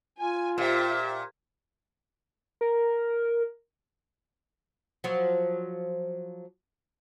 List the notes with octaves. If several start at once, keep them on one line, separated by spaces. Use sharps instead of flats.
F4 G#5
A#2 G4 C5 E5
A#4
F3 F#3